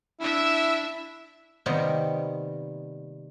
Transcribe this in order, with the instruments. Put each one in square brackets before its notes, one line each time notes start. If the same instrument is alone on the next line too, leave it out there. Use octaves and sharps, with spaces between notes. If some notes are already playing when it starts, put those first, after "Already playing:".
[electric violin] D4 E5 [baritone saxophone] E4
[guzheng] C3 D#3 G3 A#3 B3